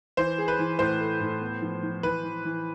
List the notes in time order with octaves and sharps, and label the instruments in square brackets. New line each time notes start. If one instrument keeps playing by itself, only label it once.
[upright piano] E3 [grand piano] C5
[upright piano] G#4
[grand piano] B4
[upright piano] E3
[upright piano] A2 [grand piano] C5
[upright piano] A3
A2
B3
F3
F3
[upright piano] E3 [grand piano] B4
[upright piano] E3
E3